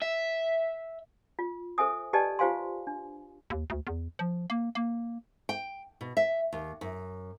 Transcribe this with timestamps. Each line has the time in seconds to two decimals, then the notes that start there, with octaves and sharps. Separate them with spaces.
0.02 E5
1.39 F4
1.78 A4 C5 E5 G#5 D#6
2.13 G4 B4 D5 D#5 G#5 A5
2.39 F4 G4 C5 F5 G#5 C6
2.87 D4
3.50 D#2
3.70 D2
3.87 E2
4.19 F3
4.50 A#3
4.75 A#3
5.49 G5
6.01 B2
6.17 E5
6.53 D#2
6.81 F#2